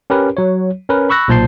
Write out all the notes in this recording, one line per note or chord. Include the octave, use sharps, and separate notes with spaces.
C#4 G4 A#4 B4
F#3 C#5
C#4 A#4 B4
B5 C#6 E6 F#6 A#6
B1 A#2 C5 A5 G6 C7